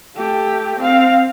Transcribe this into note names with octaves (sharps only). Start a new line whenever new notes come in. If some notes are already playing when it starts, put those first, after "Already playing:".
A3 G4
C4 F5